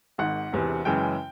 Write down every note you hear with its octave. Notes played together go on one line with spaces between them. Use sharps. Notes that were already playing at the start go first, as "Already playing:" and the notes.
G#1 G#2 D#3 F#5
E1 E2 C3
F#2 C#3 E3 G#3 G5